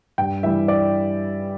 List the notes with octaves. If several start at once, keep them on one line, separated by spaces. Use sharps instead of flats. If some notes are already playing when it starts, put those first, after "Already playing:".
G2 G5
E3 G3 E5
D5